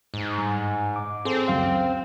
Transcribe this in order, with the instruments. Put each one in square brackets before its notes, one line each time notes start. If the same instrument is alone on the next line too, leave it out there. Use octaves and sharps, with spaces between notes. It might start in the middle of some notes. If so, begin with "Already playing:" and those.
[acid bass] G#2
[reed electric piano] G2
D6
[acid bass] C4 [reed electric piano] G#4 A4 C5
[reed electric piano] C#2 F#2 F5